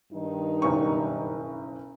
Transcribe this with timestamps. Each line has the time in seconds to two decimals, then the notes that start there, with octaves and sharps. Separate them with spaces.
0.13 G2 D#3 D#4
0.62 F#1 B1 C#6